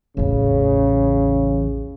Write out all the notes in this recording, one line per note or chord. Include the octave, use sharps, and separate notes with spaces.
A1 E2 C#3